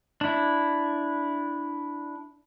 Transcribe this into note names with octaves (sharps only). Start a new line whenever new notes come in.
D4 E4